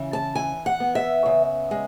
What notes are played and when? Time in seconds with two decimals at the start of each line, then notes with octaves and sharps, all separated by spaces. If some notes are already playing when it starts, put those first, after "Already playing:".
Already playing: C#3 E3
0.13 A5
0.35 E3 G#5
0.66 F#5
0.80 B3
0.95 E5
1.26 C#3
1.71 G#3